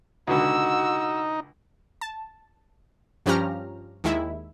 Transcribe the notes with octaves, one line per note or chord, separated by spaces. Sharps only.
C#2 B2 D3 D#4 F#4 E6
A5
G2 F3 C#4 G4 A#5 F6
D#2 D#3 G#3 E4 E5